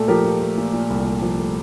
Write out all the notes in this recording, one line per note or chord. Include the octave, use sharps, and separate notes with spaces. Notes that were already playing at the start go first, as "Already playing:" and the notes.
Already playing: A#2 A3 A4
F3 G4 A#4
F3
A3
A#2
A#2
C2
A#2
F3
A3